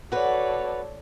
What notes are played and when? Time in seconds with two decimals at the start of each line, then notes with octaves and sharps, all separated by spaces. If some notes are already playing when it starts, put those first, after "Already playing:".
0.12 F#4 A4 B4 C#5 D5